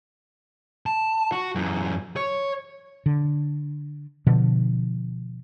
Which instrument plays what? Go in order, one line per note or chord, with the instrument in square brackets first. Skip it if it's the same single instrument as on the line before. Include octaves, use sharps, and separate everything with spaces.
[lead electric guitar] A5
F#4
F#2 E3
C#5
[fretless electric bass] D3
B2 D3 F3